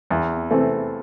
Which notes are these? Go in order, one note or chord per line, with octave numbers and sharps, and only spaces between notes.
E2
C3 E3 A3 C4